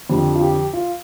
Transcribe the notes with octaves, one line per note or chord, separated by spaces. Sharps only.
F2 D3 F3 G4
F4
G4
F4